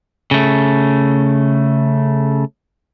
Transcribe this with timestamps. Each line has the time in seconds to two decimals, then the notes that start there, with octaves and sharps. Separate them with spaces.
0.31 C#3 A3